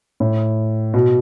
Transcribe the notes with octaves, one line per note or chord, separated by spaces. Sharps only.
A2
B2